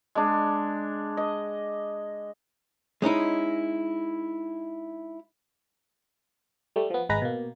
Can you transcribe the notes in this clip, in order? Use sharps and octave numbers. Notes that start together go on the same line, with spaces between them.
G#3 D4
D#5
G#3 C#4 D#4 E4
G3 A3
F3 B3
G#1 G#3 B4 A#5
B2 A#3